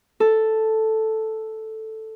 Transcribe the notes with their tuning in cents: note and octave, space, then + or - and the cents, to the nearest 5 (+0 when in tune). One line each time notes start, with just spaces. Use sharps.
A4 +0